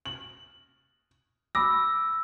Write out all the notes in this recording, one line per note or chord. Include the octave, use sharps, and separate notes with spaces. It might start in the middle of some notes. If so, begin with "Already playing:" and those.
F#7
B5 D6 E6 A#6